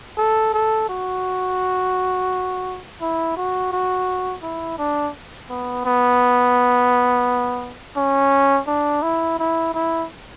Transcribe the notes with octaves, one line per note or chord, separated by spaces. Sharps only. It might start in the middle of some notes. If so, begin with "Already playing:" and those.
A4
A4
F#4
E4
F#4
F#4
E4
D4
B3
B3
C#4
D4
E4
E4
E4